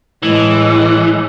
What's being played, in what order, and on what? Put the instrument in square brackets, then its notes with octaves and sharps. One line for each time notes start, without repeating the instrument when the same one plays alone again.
[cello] A2 G#3 [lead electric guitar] E3